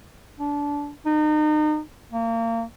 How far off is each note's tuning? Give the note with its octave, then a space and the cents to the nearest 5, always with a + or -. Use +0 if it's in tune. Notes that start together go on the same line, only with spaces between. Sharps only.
D4 -20
D#4 -35
A#3 -30